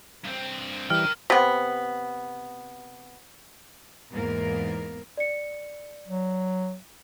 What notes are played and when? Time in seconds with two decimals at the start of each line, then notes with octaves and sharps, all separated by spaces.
0.25 G2 C4
0.90 E3 G3 A#4 G5 F6
1.30 C3 B3
4.13 E2 G#2 A#3 B3 A#4
5.17 D5 C#7
6.08 F#3